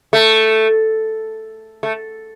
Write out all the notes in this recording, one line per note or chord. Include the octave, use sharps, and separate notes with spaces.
A3
A3